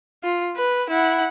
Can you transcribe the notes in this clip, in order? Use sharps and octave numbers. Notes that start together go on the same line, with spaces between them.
F4
B4
E4 F#5